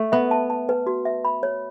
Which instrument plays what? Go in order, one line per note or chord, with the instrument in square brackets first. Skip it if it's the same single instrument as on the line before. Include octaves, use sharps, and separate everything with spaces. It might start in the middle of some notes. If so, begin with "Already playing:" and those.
Already playing: [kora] A3
[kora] B3 [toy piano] E5
[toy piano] A5
A5
B4
F#4
E5
B5
C#5